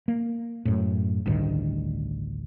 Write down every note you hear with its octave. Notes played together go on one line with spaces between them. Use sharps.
A#3
F#2 A2
A1 D2 G2 D#3